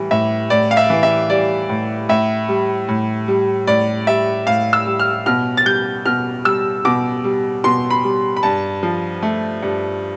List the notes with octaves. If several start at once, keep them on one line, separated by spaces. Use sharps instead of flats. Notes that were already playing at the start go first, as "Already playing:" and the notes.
Already playing: A2 E3 G3
A2 E5
A2 D5
F5
E5
E3
E5
G3 D5
A2
A2 E5
G3
A2
G3
A2 D5
G3 E5
A2 F5
E6
G3
F6
B2 F6
A6
G3 G6
B2 F6
G3 E6
B2 D6
G3
B2 C6
B5
G3
B5
G2 A5
F3
A3
G2